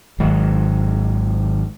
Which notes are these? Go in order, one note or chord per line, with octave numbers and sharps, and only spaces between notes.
G#1 G#2 D#3 F#3